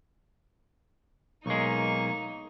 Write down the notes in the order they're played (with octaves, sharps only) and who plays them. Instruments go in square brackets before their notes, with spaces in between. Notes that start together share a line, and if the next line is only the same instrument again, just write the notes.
[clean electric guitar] B1 G#3 [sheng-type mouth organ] A#3 C#6 [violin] D#4